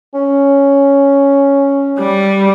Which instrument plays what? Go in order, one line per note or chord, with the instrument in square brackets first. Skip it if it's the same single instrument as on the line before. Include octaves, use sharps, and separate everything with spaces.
[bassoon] C#4
[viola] G3